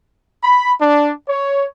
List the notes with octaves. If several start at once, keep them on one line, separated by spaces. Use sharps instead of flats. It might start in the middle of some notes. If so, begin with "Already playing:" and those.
B5
D4
C#5